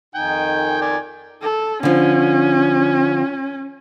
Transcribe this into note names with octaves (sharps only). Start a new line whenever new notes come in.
F2 D#3 D#4 G5 G#5
D5 G#5
A4
D3 F3 C#4